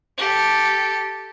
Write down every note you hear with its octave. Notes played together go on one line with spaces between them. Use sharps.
G4 A4